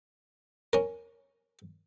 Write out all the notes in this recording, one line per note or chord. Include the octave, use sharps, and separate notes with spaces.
C#4 A#4